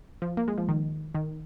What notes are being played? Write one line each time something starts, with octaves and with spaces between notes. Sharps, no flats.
F3
A#3
G#3
F3
D#3
D#3